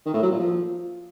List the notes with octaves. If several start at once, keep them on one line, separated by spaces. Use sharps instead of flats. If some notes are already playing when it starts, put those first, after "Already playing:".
D#3
A2
F#3
A#2
F3